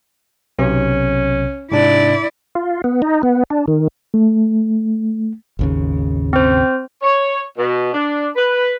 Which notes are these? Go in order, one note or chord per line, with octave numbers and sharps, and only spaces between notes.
B1 C3 C#4
G#2 C3 D4 E4 D5
F4
B3
D#4
B3
D4
D#3
A3
G#1 D#2 C#3
C4 C5
C#5
B2
D4
B4